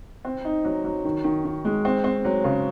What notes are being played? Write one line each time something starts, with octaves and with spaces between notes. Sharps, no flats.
C4
D#4
F#3
F#3
D#3
D#3
D#3
G#3
C4
C4
F#3
C#3